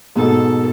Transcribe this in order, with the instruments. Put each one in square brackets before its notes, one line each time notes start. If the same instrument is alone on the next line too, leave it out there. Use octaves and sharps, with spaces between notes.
[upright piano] G#2 B2 [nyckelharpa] A4